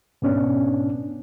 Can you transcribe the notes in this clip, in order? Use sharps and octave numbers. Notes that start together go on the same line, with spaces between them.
G#2 B2 B3 C#4 D4